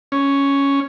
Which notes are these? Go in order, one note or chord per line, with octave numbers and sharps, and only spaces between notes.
C#4